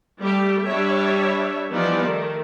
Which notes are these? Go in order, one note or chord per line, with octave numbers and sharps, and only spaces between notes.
G3 A3 G4
G3 D4 C#5 E5
E3 F3 G3 B3 D#4 D5
D#3 A3